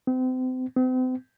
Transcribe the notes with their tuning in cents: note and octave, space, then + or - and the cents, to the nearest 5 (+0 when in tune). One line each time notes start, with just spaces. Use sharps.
C4 -35
C4 -40